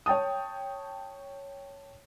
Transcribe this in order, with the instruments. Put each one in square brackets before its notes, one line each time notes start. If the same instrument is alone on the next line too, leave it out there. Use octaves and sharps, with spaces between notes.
[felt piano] C#5 G5 A5 D#6